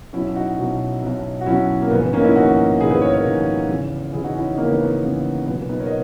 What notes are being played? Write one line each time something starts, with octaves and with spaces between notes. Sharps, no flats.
B1 B2 F#3 C#4 E4
D#4 F#4
B1 B2 F#3
B1 B2 F#3
F#4
B1 B2 F#3 C#4 E4
A#3
A#1 G#2 D#3 B3
B3
A#3 C#4
D#4
C#4 E4
A#1 G#2 D#3 D#4 F#4
A#1 G#2 D#3 E4 G#4
G#4 B4
A#4 C#5
A#4 C#5
A#1 G#2 D#3
E2 C#3 E3
E2 C#3 E3 E4 G#4
D#4 F#4
C#4 E4
D#4
E2 C#3 E3 A#3 C#4
B3 D#4
B3
A#3
E2 C#3 E3
B1 A#2 F#3 B3
B3
B3 D#4
A#4 C#5
D#5